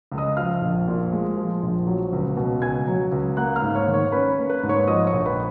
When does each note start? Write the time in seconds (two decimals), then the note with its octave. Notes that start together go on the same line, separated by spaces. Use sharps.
0.12 C#2
0.18 D#5 D#6
0.37 F3 F5 F6
0.62 A#1
0.88 A#2
1.13 G#3
1.37 F3
1.63 A#1
1.87 F#3
2.13 C#2
2.37 B2
2.62 C#2 G#5 G#6
2.87 F#3
3.12 C#2
3.37 A#3 F#5 F#6
3.56 F5 F6
3.62 G#2
3.75 C#5 C#6
3.88 D#3
3.94 C#5 C#6
4.12 C#4 B4 B5
4.37 A#3
4.50 B4 B5
4.63 G#2
4.69 C#5 C#6
4.88 F3 D#5 D#6
5.07 C#5 C#6
5.13 A#1
5.26 B4 B5